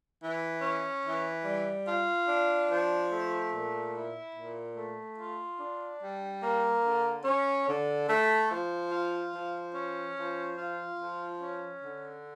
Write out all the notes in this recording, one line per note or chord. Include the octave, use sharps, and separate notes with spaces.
E3
C#4
E3
G3
F4
D4
F3
A3
A#2
E4
A#2
A3
F4
D4
G3
A#3
D3
C#4
D3
A3
F3
F4
F3
C#4
F3
F4
F3
C#4
D3